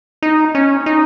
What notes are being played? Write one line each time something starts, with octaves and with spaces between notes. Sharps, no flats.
D#4
C#4
D#4